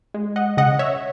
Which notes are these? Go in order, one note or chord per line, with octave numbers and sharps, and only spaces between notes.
G#3
D#5 F#5
C#3 D#5 F#5
C#5 E5